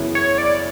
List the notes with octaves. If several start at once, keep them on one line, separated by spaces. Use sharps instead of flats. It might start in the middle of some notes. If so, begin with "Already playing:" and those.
Already playing: F#2 C#3 E3 B3 E4
C#5
D5